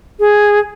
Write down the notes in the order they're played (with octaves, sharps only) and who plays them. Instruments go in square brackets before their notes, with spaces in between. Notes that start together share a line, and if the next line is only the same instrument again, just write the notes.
[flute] G#4